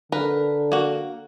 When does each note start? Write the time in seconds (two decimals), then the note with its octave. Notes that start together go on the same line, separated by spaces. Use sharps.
0.12 D3 A#4 B4
0.72 A#3 F#4